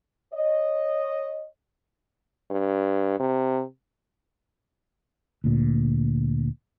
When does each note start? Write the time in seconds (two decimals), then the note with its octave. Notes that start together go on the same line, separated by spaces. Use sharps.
0.33 C#5 D#5
2.51 G2
3.20 C3
5.44 D2 A#2